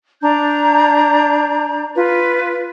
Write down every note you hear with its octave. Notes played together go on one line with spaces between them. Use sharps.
D4 A#5 G6
F4 B4